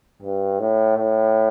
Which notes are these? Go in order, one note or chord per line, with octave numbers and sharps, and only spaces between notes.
G2
A2
A2